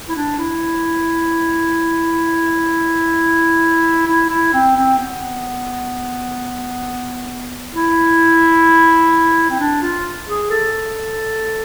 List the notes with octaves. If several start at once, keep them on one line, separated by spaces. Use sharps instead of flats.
E4
D4
E4
E4
E4
C4
C4
B3
E4
C4
D4
F4
G#4
A4